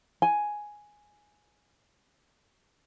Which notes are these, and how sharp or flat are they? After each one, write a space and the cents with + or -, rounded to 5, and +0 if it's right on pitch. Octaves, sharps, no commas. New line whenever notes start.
G#5 +5